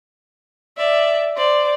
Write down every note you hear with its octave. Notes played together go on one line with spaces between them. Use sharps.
D5 E5
C5 D5